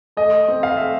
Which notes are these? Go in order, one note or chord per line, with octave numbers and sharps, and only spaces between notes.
A3 D#5
C4
F5
A3 E5